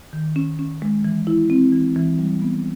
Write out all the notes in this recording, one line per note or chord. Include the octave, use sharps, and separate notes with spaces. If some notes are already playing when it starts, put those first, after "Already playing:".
D#3
C#4
C#4
G#3
E3
E4
C4
E3
E3
G3
B3